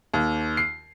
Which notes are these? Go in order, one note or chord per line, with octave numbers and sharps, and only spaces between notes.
D#2
C7